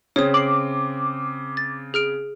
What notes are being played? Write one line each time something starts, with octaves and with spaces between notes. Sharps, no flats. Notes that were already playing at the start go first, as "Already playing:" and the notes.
C#3 C4 C#5 D#6
D6 C7 F#7
A6
G#4 F6 D7